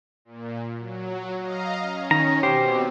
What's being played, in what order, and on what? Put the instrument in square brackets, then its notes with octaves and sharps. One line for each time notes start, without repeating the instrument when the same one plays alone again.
[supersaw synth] A#2
F#3
D#5 F5 A#5
C#4
[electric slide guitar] D#3 [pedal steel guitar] A#5
[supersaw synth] B2 C4 [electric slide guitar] G4 [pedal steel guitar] C5